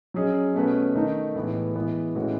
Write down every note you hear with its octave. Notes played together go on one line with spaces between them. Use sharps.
F#3 C#4 G#4 D#5
B2 A3 C#4 F#4 B4
D#3 A3 D#4
A2 E3 G#3 B3
E3 G#3 B3
A2 E3 G#3 C#4 F#4